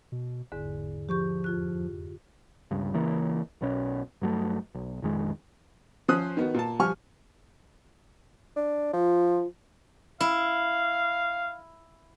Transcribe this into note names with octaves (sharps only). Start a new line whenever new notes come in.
B2
G1 E2 G#2 D3
F3 G4 C#6 G6
F2 F4 F#6
G1 C#2 G2
C#2 C#3 E3 A#3
B1 B2 C#4
G2 F#3 A3
B1
A#1 F2 D#3 G#3
F3 C#4 C5 D#6 F#6
D#3 B3 F#4
A#2 A5
F3 G3 G#5 C#6 F6
D4
F3 F4
E4 F5